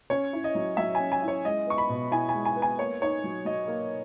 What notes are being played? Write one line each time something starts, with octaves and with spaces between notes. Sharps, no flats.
C#4 C#5
E4
D#5
F#3
F#3 E5
C#4 G#5
G#5
E4
C#5
G#3 D#5
B3 C#6
B5
B2
E4 G#5
G#3 G#5
G#5
B3
G#5
A#3 C#5
D#4 C#5
F#3
F#3 D#5
A#3